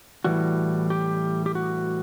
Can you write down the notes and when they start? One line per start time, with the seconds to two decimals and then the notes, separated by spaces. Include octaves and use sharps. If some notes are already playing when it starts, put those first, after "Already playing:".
0.24 A2 E3 G3 F#4
0.90 G4
1.46 G4
1.55 F#4